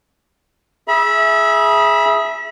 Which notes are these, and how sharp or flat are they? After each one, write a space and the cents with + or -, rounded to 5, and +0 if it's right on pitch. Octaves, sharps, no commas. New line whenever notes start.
G#4 +10 E5 +0 B5 -35